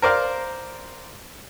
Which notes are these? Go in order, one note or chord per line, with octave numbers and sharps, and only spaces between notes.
A#4 C5 D5 F5